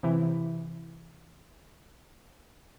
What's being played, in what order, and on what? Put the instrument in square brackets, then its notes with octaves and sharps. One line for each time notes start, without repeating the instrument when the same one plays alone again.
[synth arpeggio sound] C3 E3